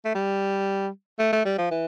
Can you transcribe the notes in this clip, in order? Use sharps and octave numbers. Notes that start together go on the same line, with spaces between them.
A3
G3
A3
A3
G3
F3
E3